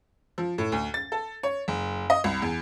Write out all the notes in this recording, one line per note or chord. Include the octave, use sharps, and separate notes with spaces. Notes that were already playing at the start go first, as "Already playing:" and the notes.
F3
A2
D2
A6
A4
C#5
F#1
D#5
C2
E2